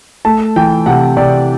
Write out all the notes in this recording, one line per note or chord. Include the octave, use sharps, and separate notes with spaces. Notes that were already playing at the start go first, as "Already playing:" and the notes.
A3 A5
E3 G5
C3 F#5
C3 D5